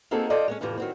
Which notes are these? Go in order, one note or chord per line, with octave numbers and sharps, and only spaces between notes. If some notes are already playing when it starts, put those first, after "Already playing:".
A#3 C4 D#4 F#4 G#4 A4
F4 A4 C5 D5 D#5
G#3 B3 C#4
F2 A2 C3 E3 F3
D#3 F#3 C4